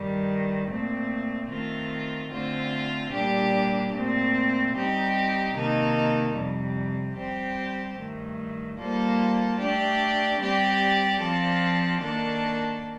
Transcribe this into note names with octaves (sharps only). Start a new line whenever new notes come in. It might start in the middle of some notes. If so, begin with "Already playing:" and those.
Already playing: G2 D#3 G3
A#2 A3 C4
D#3 A3 C4 F4
D3 A3 C4 F4 C5
A#2 G3 D4 G4
A#2 A3 C4
G3 C4 D#4 G4
C3 D#3 A#3 D#4 A4
F2 C3 G3
G3 C4 G4 C5
G2 D#3 A3
G3 A#3 F4 A4 C5
A3 D4 G4 D5
G3 C4 G4 D5
F3 C4 F4 A4 D5
D#3 A#3 D4 A4 D5